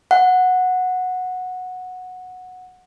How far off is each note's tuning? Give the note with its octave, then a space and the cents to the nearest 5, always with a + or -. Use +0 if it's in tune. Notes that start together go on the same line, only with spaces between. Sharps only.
F#5 -10